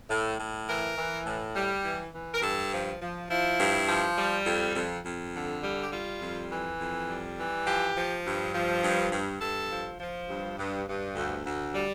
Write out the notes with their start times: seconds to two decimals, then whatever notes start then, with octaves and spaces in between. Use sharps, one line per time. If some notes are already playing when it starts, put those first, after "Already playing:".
0.10 A2
0.40 A2
0.69 E3 A#4
0.98 E3
1.27 A2
1.55 G3
1.85 E3
2.13 E3
2.34 A#4
2.43 G2 A4
2.72 F3
3.02 F3
3.30 F3 E4
3.59 G2
3.88 F3
4.17 G3
4.46 F2
4.76 F2
5.05 F2
5.34 D3
5.62 G3
5.82 G4
5.92 G3 F4
6.21 F2
6.51 E3
6.80 F2
7.09 G3
7.38 E3
7.66 F3 G4
7.96 F3
8.25 G2
8.54 F3
8.83 G2
9.12 G2
9.41 G2 A4
9.70 F3
10.00 F3
10.29 G2
10.58 G2
10.87 G2
11.16 D2
11.45 D2
11.75 G3